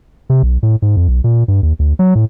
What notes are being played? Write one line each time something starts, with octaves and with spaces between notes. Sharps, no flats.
C3
B1
A2
G#2
F2
B1
A#2
G2
D#2
D2
F#3
A2